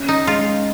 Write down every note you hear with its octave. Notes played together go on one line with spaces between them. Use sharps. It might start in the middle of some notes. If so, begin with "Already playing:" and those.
Already playing: C#4
D#4
G#3 F4